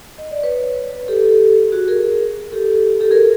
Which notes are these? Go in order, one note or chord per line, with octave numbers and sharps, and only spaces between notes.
D#5
D5
B4 C#5
G4 A4
F#4 G#4
G#4 A#4
G4 A4
G4 A4
G#4 A#4